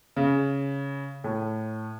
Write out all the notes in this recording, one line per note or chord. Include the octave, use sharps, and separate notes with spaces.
C#3
A2